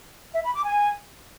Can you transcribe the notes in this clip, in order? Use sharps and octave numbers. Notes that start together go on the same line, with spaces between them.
E5
B5
D6
G#5